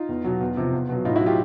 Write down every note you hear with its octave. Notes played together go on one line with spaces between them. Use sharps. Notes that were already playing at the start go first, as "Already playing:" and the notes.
Already playing: D#4 F4
E2
B2 F#3
E2
C3 F3
E2
B2 F#3
A2 D#4 F4
E4 F#4
F#3
F4 G4